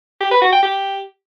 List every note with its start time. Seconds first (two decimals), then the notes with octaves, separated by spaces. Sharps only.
0.21 G4
0.31 B4
0.42 F#4
0.52 G5
0.63 G4